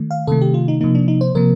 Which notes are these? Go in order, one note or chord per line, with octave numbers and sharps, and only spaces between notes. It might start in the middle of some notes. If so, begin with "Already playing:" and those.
Already playing: D#3 A3
F5
C3 D#3 A3 A4
G4
F4
D#4
C3 F3 A#3 D#4
D4
D#4
C5
C3 F3 A#3 A#4